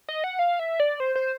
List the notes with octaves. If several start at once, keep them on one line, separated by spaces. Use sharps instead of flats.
D#5
F#5
F5
E5
D5
C5
C5